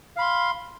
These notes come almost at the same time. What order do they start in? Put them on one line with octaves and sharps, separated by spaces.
F5 B5 C6